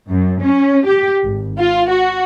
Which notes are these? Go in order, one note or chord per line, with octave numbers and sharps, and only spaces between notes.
F#2
C#4
G4
G#1
F4
F#4